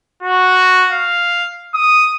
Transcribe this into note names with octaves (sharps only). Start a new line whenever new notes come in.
F#4
F5
D#6